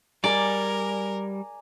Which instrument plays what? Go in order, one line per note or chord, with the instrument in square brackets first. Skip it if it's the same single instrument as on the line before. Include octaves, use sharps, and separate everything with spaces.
[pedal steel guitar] G3 [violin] A#4 [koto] D5 [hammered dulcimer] G#5 A#5 D6